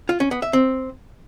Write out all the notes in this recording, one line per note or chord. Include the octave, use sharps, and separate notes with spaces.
F4
C#4
B3
E5
C4